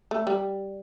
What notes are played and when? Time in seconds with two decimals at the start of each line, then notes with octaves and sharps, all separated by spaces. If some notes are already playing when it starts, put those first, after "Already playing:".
0.11 A3
0.27 G3